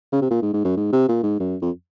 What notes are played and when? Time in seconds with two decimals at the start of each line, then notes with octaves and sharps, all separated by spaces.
0.13 C#3
0.21 C3
0.31 A#2
0.42 G#2
0.54 G#2
0.65 F#2
0.77 G#2
0.93 C3
1.09 A#2
1.23 G#2
1.40 F#2
1.62 F2